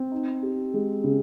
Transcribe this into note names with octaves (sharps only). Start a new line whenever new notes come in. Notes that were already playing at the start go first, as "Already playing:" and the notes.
Already playing: C4
D#4
G4
G#3
C#3